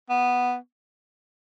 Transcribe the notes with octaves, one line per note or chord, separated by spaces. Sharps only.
B3